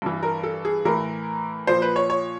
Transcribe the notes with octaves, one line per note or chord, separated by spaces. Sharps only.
G2 E3
A#4
A4
G#4
A2 E3 A#4
A#2 F3 C5
B4
C#5
C#5